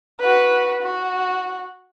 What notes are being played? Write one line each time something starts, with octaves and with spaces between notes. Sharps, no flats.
F#4 B4
F#4